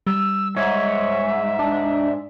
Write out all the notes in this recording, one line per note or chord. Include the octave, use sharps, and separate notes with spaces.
G3 E6
G#2 C#5 E5
D4